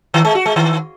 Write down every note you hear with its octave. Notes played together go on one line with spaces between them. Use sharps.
D#3
G#3
F#4
G#3
D#3